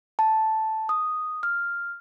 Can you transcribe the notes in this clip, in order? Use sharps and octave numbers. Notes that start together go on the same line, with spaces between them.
A5
D#6
F6